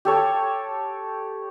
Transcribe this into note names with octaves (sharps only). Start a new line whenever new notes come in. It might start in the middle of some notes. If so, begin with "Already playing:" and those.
G4 A4 C#5